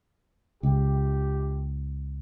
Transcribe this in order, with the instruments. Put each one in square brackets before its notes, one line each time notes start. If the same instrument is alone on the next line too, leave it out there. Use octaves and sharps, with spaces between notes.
[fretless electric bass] C#2 [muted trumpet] G4